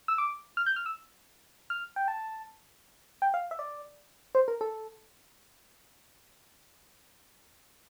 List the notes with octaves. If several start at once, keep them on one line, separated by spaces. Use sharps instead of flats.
E6
D6
F6
G6
F6
E6
F6
G5
A5
G5
F5
E5
D5
C5
A#4
A4